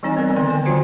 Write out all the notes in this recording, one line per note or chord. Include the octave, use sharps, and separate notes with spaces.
E3 G3 C4 D#4 C#5 G#5
B3 C4 A#4 D5
D3 D#3 B4 G5
G#5
F3 F#3 D4 F4 F#4 C5